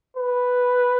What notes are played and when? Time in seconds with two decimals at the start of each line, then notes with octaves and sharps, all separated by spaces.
0.17 B4